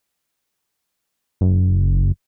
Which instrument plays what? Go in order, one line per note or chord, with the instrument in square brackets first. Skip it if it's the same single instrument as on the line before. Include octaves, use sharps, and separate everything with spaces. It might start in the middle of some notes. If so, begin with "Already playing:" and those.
[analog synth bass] F#1